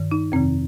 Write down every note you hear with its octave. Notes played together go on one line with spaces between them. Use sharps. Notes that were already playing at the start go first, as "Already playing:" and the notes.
Already playing: G2 D#3
D#4
F2 C3 D#3 C4